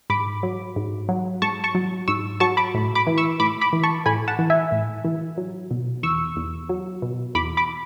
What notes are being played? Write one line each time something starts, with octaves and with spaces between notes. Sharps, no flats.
G#2 B5 D6
F#3
G#2
F#3
G#2 A5 C#6
A5 C#6
F#3
G#2 C#6 E6
F#3 A5 C#6
B5 D6
A2
B5 D6
E3
C#6 E6
A2 B5 D6
B5 D6
E3
A5 C#6
A2 G#5 B5
F#5 A5
E3
E5 G#5
A2
E3
F#3
B2
E2 C#6 E6
E2
F#3
B2
E2 B5 D6
B5 D6